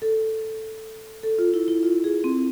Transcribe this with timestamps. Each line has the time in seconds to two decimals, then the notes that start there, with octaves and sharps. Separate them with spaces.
0.02 A4
1.23 A4
1.38 F4
1.54 E4
1.68 E4
1.83 F4
2.04 G#4
2.24 C4